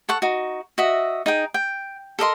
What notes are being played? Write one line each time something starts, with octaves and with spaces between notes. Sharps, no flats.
A4 F#5 C#6
D#4 F#4
F#4 D#5 E5
D#4 G#4 G5
G5
A4 A#4 D#5 C6